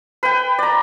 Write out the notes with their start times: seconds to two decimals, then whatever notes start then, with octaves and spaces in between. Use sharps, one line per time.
0.23 B4 G5
0.58 D5 A#5